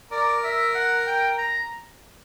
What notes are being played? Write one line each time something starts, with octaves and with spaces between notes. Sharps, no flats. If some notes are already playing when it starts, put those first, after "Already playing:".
A#4 D5
E5
F#5
G5
A#5